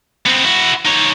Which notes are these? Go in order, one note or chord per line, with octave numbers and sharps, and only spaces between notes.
B3 C4
E4 F#4
D#4 C#5